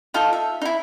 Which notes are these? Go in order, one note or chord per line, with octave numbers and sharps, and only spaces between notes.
D#4 F4 A4 F5
E5
D#4 E4